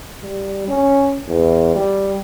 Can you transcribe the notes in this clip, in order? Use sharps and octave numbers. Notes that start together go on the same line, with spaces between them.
G3
C#4
E2
G3